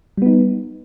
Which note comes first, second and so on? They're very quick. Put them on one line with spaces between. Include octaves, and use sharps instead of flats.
G3 B3 D#4